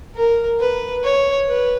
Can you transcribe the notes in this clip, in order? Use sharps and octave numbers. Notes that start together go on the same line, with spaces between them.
A#4
B4
C#5
B4